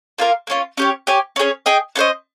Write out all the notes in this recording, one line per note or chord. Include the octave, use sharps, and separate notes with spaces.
A#3 F4 A#4 F5
A#3 C#4 F4
C#4 G4 C#5
G4 C#5 G#5
C#4 G#4 C#5
G#4 D#5 G5
C#4 F4 C5 D#5